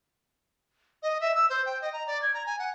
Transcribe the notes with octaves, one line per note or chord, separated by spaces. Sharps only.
D#5
E5
E6
C5
G5
D#5
A#5
D5
G#6
A#5
G#5
F#5